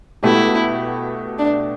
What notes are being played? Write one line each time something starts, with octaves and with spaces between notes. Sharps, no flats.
B2 A3 E4 G4
D4